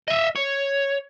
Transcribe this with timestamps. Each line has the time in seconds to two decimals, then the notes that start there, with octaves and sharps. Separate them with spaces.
0.08 D#5 E5
0.36 C#5